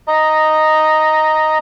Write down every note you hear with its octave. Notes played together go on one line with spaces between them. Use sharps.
D#5 A#5